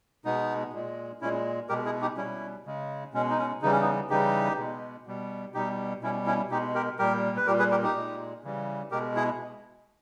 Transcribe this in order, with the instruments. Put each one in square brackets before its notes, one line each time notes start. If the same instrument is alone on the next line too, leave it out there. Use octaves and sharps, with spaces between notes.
[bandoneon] B2 G#3 B3 D#4
A#2 G#3
A#2 G#3 C#4 E4
B2 G#3 G4 A#4
E4 G#4
D#4 G4
B2 G3 C#4 E4
C#3 G#3
B2 G#3 C#4
D#4
C#4
C#3 E3 G3 D#4
C#4
B3 D#4
C#3 E3 G3 D#4 G4
B2 G#3
B2 G3
B2 G3 D#4 G4
B2 G3 C#4 E4
C#4 E4
B2 G#3 D#4 G4
G4 A#4
A#2 G3 G4 A#4
B4
A#2 G3 G4 A#4
G#4 B4
G4 A#4
D#4 G4
A#2 G#3
C#3 E3 G3
B2 G#3 G4 A#4
E4 G#4